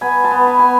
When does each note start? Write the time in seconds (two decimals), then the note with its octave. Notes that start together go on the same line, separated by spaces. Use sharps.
0.01 B3 G#5 B5
0.24 A5 C6
0.31 B3
0.47 G#5 B5
0.59 B3 G#5